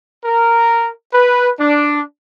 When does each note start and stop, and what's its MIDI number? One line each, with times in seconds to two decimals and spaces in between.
0.25 0.89 70
1.13 1.49 71
1.59 2.01 62